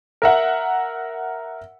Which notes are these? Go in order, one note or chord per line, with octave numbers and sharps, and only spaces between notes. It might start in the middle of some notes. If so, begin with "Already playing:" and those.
A#4 E5 F#5